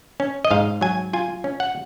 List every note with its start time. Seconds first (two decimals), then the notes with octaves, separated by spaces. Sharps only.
0.20 C#4
0.45 D#5
0.51 G#2 F5
0.81 F#3 G#5
1.13 F4 G#5
1.44 C#4
1.60 F#5